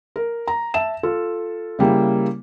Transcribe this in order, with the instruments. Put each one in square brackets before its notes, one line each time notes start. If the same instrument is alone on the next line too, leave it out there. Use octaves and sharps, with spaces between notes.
[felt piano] A#4
A#5
E5 A5 E7
F4 A4
C#3 G3 A#3 E4